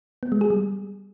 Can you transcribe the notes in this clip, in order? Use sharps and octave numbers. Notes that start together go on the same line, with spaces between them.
B3
G#3
G#4
G3